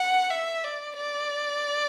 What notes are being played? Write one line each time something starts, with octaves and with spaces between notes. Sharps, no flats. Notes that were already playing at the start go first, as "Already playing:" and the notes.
Already playing: F#5
E5
D5
D5